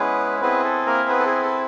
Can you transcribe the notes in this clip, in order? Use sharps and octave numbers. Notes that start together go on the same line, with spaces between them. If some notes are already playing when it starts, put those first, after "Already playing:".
Already playing: G#3 B3 C#4 E4 G#4 B4
B3 C4 E4 G#4 B4
A4
A#3 A#4
B3 B4
A4
G#4
A4